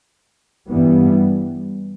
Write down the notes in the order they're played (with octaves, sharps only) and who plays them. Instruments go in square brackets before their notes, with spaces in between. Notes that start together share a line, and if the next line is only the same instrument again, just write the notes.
[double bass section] G2 E3 G3 B3